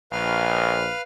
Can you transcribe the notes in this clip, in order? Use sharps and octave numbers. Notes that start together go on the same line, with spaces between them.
A#1 B4 F5 F6